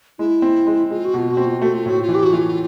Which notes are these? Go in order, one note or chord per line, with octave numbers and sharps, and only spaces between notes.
G#3 E4
C4
G#3
G#3 F4
F#4
B2 F4
F#4
C4
F4
A3 F#4
F4
A2 F#4
F4
E3
G4
F#4
E3 F4